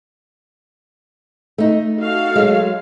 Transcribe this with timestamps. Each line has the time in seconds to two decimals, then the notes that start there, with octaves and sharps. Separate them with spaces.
1.58 A3 D#4
2.00 F#4 A4 F5
2.35 F#3 G#3